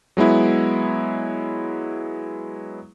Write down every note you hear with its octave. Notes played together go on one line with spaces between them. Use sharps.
F#3 G#3 B3 E4